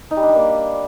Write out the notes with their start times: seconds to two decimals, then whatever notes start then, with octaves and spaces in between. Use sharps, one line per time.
0.11 D#4
0.17 G3
0.23 D4
0.29 G3
0.35 A#3